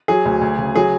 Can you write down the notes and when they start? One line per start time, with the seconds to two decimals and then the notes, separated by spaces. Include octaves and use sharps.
0.08 F#3 G#4
0.25 D2
0.41 D2
0.58 C#3
0.75 F#3 G#4